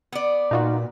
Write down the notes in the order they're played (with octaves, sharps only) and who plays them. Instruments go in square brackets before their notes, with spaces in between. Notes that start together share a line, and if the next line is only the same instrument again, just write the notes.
[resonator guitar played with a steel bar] B3 D5
[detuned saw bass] A#2 [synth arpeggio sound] D#4 F4 F#4